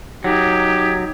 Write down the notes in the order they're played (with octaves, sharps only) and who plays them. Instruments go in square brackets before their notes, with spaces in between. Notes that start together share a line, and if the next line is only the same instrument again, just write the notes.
[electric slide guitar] F#3 [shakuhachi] D#4 [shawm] G4 [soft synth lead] G#6